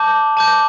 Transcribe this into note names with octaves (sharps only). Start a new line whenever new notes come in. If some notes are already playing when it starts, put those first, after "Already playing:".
Already playing: A5 D6 G6
A5 D6 G6